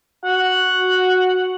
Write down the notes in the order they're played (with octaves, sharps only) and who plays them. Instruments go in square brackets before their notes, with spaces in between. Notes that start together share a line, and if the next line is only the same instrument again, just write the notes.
[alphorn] F#4 [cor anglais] F#5